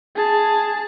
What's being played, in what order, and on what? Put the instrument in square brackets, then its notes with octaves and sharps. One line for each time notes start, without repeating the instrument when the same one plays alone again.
[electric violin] G#4 A5